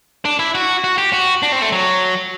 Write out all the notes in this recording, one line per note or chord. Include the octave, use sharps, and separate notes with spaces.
D4
E4
F#4
F#4
G4
F#4
D4
C4
A3
F#3